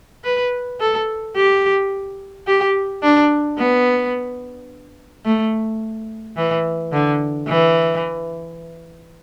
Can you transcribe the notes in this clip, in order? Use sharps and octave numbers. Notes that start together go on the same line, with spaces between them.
B4
A4
G4
G4
D4
B3
A3
E3
D3
E3